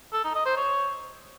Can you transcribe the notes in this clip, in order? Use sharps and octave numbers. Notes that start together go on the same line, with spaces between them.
A4
D#4
D#5
C5
C#5